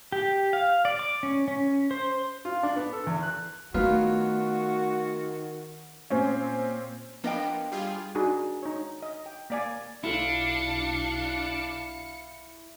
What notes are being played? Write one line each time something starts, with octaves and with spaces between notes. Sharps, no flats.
G4
F5
D5
D6
C#4
C#4
C5
F4
D4
B3
A4
E2
F#6
D#3 F#3 A3 B3 F4 F#4
A#2 C4 C#4
F3 A#3 B3 D4 D#5 G5
G3 F4 G#4
D4 D#4 F#4 G#4
D#4 C#5
D#5
G5
A#3 D5 G#5
B1 D4 E4 F4 A4 F5 C#7